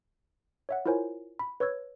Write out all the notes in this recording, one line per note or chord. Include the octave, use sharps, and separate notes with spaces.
C#5 E5 F#5
E4 F4 A#4 C5 C#5 G#5
B5
B4 C#5 C#6 E6 G#6